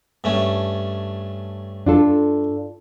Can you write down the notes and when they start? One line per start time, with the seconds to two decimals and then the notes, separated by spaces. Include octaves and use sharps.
0.24 G2 A3 C#4
1.86 D4 F4 A4